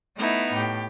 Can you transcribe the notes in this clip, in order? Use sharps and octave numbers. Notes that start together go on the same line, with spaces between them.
A3 B3 D#4 E4
A2 G4